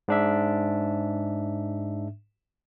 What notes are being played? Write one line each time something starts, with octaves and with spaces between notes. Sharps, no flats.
G#2 D4 E5